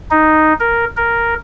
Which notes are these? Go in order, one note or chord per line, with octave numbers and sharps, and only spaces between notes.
D#4
A#4
A#4